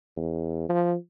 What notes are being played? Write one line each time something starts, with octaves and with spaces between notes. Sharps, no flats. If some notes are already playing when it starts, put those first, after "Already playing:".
E2
F3